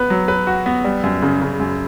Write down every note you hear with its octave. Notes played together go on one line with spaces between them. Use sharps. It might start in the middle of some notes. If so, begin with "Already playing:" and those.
Already playing: B3 B4
F#3
B4
F#4
B3
G3
F#2
C#3
C#3
F#2